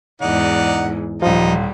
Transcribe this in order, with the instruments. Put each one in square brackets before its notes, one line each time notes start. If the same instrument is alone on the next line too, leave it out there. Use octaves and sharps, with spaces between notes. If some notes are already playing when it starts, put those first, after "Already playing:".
[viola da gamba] E2 G#2 [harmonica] D#4 D5 F#5
[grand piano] D#1 F4 [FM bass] F3 [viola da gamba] G3 [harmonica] D#4